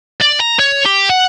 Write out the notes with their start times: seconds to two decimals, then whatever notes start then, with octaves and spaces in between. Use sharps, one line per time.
0.21 D5
0.40 A#5
0.59 C#5
0.85 G4
1.10 F#5